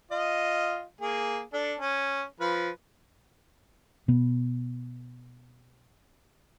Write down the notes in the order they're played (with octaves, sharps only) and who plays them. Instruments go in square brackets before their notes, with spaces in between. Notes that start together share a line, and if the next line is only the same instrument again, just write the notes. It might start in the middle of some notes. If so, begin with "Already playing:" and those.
[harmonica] F4 D#5
A#3 G#4
D4 A4
C#4
F3 B4
[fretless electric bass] B2 B3